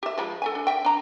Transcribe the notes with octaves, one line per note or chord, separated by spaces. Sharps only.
G4 E5
F3 G#3 B5
A4 E5 G#5
D4
E5 G5
D4 A#5